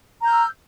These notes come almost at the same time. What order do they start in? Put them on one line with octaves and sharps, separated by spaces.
A#5 G6 F6 E6